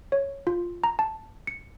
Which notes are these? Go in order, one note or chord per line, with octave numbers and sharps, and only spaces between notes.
C#5
F4
A#5
A5
C#7